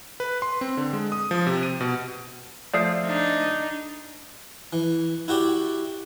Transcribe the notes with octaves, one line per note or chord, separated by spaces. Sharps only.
B4
C6
C4
D3
G#3
D#6
F3
C3
D#7
B2
F3 A3 D5 D#6 C7
D4 D#4
E3
E4 F#4 G4 D5